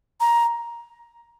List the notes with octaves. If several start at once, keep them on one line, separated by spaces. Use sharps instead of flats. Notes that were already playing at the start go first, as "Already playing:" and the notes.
A#5